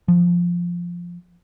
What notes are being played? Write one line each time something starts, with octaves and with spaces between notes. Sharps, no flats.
F3